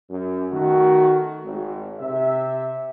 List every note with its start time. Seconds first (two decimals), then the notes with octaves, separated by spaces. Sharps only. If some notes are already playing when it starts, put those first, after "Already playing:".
0.11 F#2
0.52 D#3 A3 F#4
1.45 G#1
1.99 C3 E5